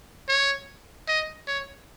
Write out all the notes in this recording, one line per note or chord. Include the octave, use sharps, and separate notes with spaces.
C#5
D#5
C#5